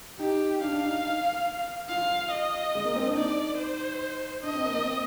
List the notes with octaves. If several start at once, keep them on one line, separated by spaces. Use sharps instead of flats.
D#4 G4
D4 F5
D4
D#4
F4 F5
D#5
G#3
A#3
C4
D4
D#4 D5
C5
D4 D#5
C4
A#3
A#3
C4